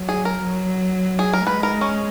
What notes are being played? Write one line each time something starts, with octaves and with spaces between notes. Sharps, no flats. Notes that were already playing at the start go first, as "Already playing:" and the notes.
Already playing: F#3
G#4
A#4
F#3
G#4
A#4
G#3 B4
A#4
C#4